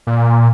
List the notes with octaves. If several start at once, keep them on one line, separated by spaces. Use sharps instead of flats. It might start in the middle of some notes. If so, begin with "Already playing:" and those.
A#2